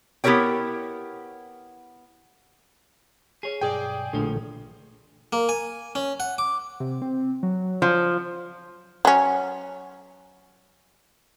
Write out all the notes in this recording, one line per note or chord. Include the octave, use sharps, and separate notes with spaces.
B3 E4 G4 A#4 C#5 G5
G#4 C#5
B1 G2 G#4 D5 G5
A#1 A2 D3 F3
A#3
G#5
C#4
F#5
D6
C3
C4
F#3
F3
F#3 C#4